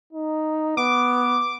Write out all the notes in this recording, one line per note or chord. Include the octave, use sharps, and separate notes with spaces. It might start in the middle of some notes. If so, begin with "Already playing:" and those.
D#4
B3 D6